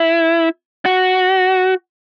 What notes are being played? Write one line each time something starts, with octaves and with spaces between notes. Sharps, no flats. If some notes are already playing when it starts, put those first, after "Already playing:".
Already playing: E4
F#4